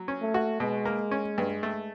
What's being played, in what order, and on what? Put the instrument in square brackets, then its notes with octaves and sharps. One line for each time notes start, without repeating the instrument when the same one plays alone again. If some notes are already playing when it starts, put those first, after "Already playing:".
Already playing: [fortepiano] F#3
C#4
[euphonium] A3
[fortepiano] F#4
[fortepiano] B2 [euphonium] G#3
[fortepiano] A#3
C#4
G2
A3